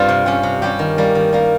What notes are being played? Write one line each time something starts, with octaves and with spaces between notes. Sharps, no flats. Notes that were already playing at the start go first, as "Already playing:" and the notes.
Already playing: G2 G3 C4 F4
C3
G3 C#4 G4
C3
G3 C#4 G4
D#3
G3 A#3
D#3
G3 A#3